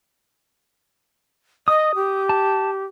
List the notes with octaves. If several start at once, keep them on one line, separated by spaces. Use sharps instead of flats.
D#5 D#6
G4
A5